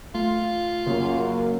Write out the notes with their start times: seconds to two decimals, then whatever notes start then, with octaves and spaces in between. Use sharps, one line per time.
0.15 A3 F4
0.87 F#2 C#3 A#3